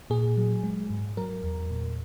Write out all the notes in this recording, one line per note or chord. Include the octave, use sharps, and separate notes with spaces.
A#2 G#4
F#3
G#3
G#2
F#3 A#4
E2
A#2